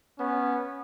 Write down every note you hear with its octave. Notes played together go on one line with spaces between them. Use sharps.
B3 C#4